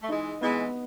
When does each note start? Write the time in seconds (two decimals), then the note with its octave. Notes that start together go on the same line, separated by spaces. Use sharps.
0.02 A3
0.09 E3 G#3 D#4
0.41 E3 G#3 B3